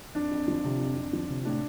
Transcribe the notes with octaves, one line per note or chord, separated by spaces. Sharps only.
F2 D4
F2
F3
C3
F2
F2
F3
C3
A2 D4